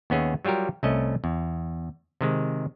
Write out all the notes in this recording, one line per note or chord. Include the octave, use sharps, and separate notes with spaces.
D#2 B3 C#4 G#4 E5
F#3 G3 F4 G4 A#4
C2 A3 C#4 D#5
E2
C3 D#3 G#3